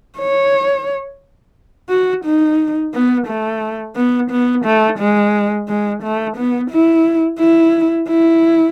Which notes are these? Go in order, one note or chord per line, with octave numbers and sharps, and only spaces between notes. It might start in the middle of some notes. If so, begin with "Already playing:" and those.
C#5
F#4
D#4
B3
A3
B3
B3
A3
G#3
G#3
A3
B3
E4
E4
E4